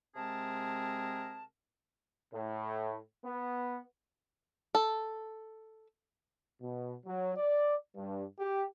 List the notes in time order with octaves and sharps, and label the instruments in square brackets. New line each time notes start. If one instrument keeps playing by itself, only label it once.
[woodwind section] C3 G#3 C4 G#4 A#4 A5
[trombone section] A2
B3
[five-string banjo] A4
[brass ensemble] B2
F#3
D5
G2
G4